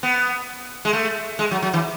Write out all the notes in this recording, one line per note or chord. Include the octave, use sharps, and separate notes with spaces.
B3
G#3
A3
G#3
F#3
F#3
E3